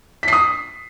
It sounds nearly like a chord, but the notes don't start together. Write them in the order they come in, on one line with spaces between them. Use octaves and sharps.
B6 C7 D#6